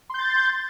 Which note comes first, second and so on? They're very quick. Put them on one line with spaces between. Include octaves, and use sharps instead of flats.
C6 G6 A6